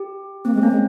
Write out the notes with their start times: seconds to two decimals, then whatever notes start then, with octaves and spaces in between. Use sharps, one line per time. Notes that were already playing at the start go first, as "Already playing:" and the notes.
Already playing: G4
0.45 A#3 C4
0.54 G#3
0.57 C4
0.62 A#3 C#4
0.71 G#3